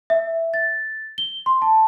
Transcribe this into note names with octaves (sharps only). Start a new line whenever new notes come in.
E5
A6
G7
C6
A5